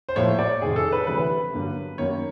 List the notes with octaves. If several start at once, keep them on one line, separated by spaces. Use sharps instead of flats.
C5
A2 F3 A#3 C#5
D5
F2 C3 D#3 G#4
A4
B4
D2 C3 E3 G3 B4
G2 D3 F#3 A#3
F#2 D#3 F#3 A#3 C#5